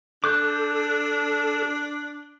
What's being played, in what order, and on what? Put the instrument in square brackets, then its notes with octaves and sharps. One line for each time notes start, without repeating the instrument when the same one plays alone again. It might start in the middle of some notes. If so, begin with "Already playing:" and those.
[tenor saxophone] D4 [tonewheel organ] A4 [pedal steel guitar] D6 F#6 G6